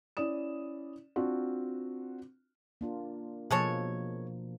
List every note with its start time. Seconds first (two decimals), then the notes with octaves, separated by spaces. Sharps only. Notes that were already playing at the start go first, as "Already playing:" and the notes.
0.17 C#4 E4 D5 D#6 E7
1.16 C4 D4 F4 F#4
2.81 A#3 D4 F4
3.51 B2 F3 G#3 A#3 A4 C#5